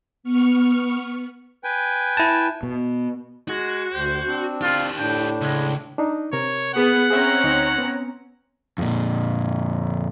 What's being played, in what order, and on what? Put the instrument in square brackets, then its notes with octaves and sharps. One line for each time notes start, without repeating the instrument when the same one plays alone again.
[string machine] B3 C#6 F6
[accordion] B4 G5 G#5
[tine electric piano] E4 A5
[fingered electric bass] B2
[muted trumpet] G#3 [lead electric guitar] F#4
[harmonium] D2 [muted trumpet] C5
[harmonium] C4 D4
[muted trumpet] F4 [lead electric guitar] G4 A#4
[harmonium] A2 D4 [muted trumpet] G5
[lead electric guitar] C#2 [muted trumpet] G#3
[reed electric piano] D4 D#4
[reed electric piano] C3 A#4 [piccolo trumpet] C#5
[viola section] B3 G#4 [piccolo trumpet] F#5
[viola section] C4 C#4 A#5 [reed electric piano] G#4 E5
[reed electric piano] D2 D#4 C#6
B3
[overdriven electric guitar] F2 A#2